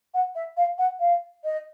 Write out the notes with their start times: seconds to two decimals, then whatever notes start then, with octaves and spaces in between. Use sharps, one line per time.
0.14 F#5
0.35 E5
0.57 F5
0.78 F#5
1.00 F5
1.44 D#5